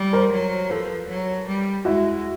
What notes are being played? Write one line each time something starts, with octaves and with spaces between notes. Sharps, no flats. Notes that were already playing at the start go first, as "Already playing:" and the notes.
Already playing: G3
A#4 C5
F#3
F3 A4 B4
F#3
G3
G#3 E4 F#4